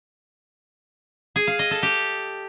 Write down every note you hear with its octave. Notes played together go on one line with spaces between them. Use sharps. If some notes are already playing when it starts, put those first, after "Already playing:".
G#4
F5
D#5
A4
G4